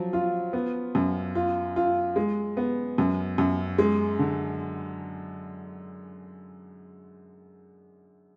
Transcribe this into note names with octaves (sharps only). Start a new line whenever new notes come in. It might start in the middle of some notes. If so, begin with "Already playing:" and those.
Already playing: F3 F#3
F4
B3
F#2
F4
F4
G#3
B3
F#2
F#2
G#3
D3